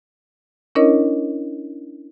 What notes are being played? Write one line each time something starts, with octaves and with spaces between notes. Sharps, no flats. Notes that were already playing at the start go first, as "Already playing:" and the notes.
C#4 D4 E4 A#4 C#5 D#5